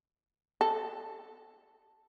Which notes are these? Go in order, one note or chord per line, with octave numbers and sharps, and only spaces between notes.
A4